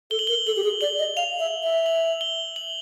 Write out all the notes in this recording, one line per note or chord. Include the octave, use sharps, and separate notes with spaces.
A4 G7
F#7
A#4 G7
A4 F#7
G4
G#4
D5 F#7
D#5
F5 F7
E5
E5
F#7
G7
F#7